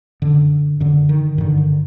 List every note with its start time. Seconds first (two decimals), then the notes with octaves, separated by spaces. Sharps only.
0.22 F#2 D3
0.80 F#2 D3
1.09 D#3
1.38 G2 D3 D#3
1.58 D3